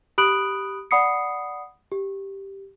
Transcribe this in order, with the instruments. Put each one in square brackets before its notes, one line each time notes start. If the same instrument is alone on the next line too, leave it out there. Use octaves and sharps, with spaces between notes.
[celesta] G4 B5 D#6 F#6 D7 F#7
D5 F#5 B5 D#6 C7 C#7
G4